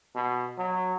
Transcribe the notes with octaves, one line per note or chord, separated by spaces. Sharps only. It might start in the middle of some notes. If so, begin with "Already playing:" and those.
B2
F#3